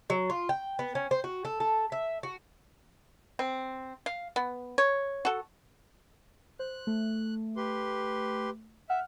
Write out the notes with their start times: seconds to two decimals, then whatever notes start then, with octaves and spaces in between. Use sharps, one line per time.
0.10 F#3
0.30 F4
0.49 G5
0.79 B3
0.95 C#4
1.11 C5
1.24 F#4
1.45 A4
1.60 A4
1.92 E5
2.23 F#4
3.39 C4
4.06 F5
4.36 B3
4.78 C#5
5.25 F#4 A4
6.59 C5 F#6
6.87 A3
7.57 G4 B4 C6
8.89 E5 F#5 F6